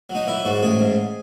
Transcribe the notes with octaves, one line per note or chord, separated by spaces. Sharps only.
F#3
D#4
E3 E4
G#2 F#4
A1 G#4
G#2